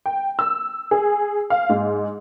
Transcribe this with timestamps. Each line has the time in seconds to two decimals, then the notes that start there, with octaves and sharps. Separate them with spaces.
0.06 G5
0.39 E6
0.91 G#4
1.50 F5
1.69 G#2